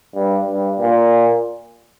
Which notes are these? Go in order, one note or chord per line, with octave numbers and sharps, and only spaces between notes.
G2
G2
A#2